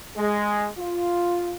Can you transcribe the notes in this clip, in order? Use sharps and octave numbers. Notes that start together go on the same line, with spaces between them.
G#3
F4